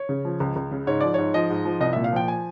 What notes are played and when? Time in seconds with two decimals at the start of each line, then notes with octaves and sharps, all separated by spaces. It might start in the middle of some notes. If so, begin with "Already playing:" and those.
Already playing: C#5
0.09 C#3
0.25 F3
0.40 C#2
0.56 C#2
0.71 C#3
0.87 G#2 C#5
1.01 F3 D5
1.14 G#2 C#5
1.34 F3 D#5
1.50 G#2
1.65 F3
1.81 C2 D#5
1.93 A#2 E5
2.04 F5
2.13 F3 G5
2.28 G#5